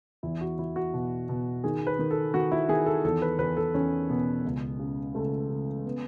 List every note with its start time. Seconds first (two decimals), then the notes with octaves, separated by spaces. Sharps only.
0.23 E2 E4
0.41 F#4
0.59 E2 E4
0.76 F#4
0.94 B2
1.29 B2
1.64 D#3 G#4
1.87 B4
1.99 D#3
2.11 A4
2.34 D#3 F#4
2.52 E4
2.69 D#3 G#4
2.86 A4
3.04 E2 A4
3.22 B4
3.39 E2 B4
3.57 A4
3.74 E2 C#4
4.09 B2 B3
4.45 C#2
4.79 C#3
5.15 C#2 A3
5.50 C#3
5.85 B3